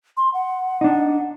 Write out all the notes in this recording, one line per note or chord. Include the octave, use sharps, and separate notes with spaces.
C6
F#5
D4 D#4